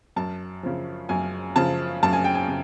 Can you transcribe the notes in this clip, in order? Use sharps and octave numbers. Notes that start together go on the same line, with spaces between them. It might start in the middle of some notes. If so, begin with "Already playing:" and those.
F#2 A5
C#3 F3
F#2 G#5
C#3 F3 A5
F#2 A5
G#5
G5
G#5
C#3